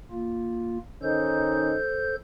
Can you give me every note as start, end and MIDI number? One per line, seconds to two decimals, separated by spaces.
0.11 0.78 58
0.11 0.78 65
1.02 1.75 51
1.02 1.75 61
1.02 1.75 63
1.02 2.15 69
1.02 2.15 72
1.02 2.15 91